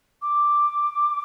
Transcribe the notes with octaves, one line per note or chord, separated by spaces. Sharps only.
D6